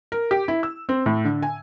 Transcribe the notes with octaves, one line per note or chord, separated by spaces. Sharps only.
A#4
G4
E4
E6
C4
A2
D3
G#5